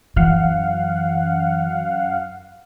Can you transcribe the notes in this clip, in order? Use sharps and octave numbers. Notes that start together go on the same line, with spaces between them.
F#2 E3 F5 F#5